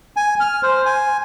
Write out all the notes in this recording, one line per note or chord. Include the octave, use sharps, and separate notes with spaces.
G#5
F6
C5
G#5